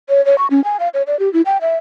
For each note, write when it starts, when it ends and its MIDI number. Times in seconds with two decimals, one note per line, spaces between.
0.09 0.24 73
0.26 0.38 73
0.38 0.47 85
0.50 0.63 61
0.64 0.77 80
0.80 0.89 77
0.94 1.02 73
1.07 1.19 74
1.19 1.31 67
1.33 1.42 64
1.46 1.58 79
1.61 1.77 76